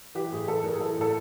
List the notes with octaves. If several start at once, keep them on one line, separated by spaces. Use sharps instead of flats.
E3 G4
A2 G#4
E3 A4
A2 A#4
G#4
E3 A4
A2 A4